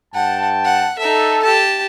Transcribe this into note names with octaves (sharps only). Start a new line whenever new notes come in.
G2 F#5 G5 A5
F#5
D#4 A4 E5
G4 A5